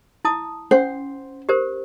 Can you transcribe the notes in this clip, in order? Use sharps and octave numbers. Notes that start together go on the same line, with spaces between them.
E4 A5 D#6
C#4 C5 F#5
G4 A#4 C5